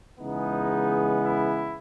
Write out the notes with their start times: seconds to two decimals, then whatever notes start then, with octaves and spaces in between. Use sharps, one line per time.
0.20 C#3 E3 G#3 B3 D#4
1.23 E4